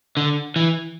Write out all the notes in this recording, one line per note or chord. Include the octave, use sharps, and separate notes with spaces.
D3
E3